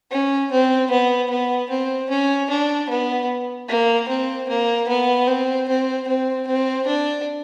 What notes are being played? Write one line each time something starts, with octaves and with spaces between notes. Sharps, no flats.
C#4
C4
B3
B3
C4
C#4
D4
B3
A#3
C4
A#3
B3
C4
C4
C4
C4
D4